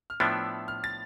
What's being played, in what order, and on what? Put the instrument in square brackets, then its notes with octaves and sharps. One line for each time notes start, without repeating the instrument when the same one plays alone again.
[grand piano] F6
[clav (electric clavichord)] A2 F3 B3 D4 [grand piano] E6
[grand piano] F6
A6